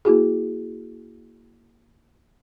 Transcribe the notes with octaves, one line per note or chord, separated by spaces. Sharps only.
A#3 E4 F#4 G#4